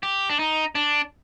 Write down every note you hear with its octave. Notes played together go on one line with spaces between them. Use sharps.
G4
D4
D#4
D4